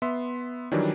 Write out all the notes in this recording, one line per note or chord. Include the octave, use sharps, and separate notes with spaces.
B3 E5 C6
D#3 E3 F#3 G3 D4